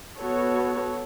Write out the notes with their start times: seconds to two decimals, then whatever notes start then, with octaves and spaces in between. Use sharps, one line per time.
0.18 B3 F#4 A4 C#5